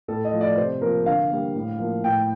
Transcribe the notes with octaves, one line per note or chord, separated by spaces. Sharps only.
A2 A4
D#5
F3 A3
D5
C3 C5
F3 A#3 A#4
D3 F5
G3 A#3
A2
F3 A#3
A2 G5